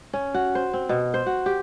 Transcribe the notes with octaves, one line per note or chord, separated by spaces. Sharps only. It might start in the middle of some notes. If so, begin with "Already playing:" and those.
C#4
F#4
C5
C4
B2
C5
F#4
G4